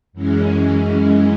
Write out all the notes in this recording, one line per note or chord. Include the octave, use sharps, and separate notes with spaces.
F#2 E3 G#3 C#4